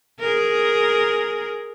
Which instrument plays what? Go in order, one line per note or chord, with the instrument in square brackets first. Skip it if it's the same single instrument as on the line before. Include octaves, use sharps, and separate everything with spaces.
[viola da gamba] G#4 A#4